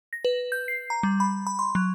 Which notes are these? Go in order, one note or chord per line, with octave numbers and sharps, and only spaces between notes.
A#6
B4
G6
C7
A#5
G3
B5
B5
C6
F#3